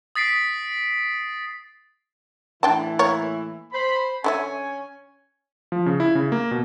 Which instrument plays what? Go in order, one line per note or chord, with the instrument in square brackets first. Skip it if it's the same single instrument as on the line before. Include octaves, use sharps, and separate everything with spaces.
[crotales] D#6 A6 B6 C7 D7
[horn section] A2 E3 E4 [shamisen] D4 G5 A5
[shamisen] A#3 A#4 C#5
[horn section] C5 B5
[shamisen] D3 E4 E5 [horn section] C#4 G#5
[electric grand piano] F3
C#3
E4
C#3
A#3
B2